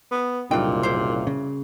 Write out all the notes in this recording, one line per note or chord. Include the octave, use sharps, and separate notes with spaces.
B3
F#1 C2 A#2 G3 D4 D#4 F4 G5
E4 C5
C#3